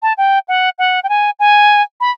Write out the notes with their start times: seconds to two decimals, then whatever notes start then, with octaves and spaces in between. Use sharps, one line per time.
0.02 A5
0.17 G5
0.48 F#5
0.78 F#5
1.03 G5
1.09 G#5
1.39 G#5
2.01 B5